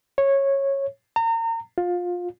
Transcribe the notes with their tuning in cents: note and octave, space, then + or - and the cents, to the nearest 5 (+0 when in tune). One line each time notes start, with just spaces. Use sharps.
C#5 -15
A#5 -35
F4 +20